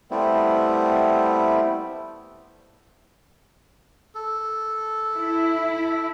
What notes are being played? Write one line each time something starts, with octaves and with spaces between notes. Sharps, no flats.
G3 A3 B3 C4 E4
A4
E4